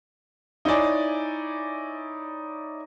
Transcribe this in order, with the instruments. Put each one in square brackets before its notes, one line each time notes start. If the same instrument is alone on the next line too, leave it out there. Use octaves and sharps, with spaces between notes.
[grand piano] D#4 E4 C#5 D5 G#5